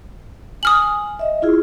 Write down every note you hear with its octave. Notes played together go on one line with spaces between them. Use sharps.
G#5 D#6 F6 F#7
D#5 E5
E4 F4 G#4